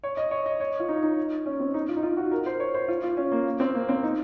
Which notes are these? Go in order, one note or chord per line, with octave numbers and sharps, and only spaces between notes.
C#5
D#5
C#5
D#5
C#5
F4
D#4
D#4
C#4
C4
D#4
F4
D#4
F4
F#4
A#4
C5
C#5
C5
F4
F4
C#4
A#3
C4
A#3
C4
D#4